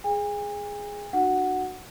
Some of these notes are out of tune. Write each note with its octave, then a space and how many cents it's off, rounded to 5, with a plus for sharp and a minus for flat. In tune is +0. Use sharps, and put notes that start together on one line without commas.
G#4 +0 G#5 -40
D4 +35 F#4 -5 F#5 +0